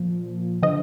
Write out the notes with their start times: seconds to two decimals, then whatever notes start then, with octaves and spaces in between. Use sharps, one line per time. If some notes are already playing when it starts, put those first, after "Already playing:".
Already playing: A#2 F3
0.63 D3 F3 D#5